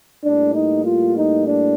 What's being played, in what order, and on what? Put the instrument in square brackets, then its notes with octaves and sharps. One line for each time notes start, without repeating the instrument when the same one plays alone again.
[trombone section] A2 G3 A#3 D4
D#4
F4
D#4
D4